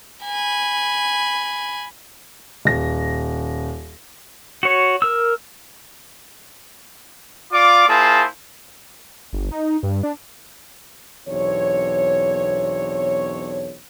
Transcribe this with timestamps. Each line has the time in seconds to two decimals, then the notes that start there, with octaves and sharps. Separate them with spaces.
0.25 G#5 B5
2.65 D#1 A#6
4.63 F#4 C#5
5.02 A#4 E6
7.53 F4 D5 F5 D6
7.88 A#3 E4 F4 G#4 C5 A5
9.33 G1
9.51 D#4
9.83 G2
10.03 D4
11.28 B1 E2 C4 D4 C#5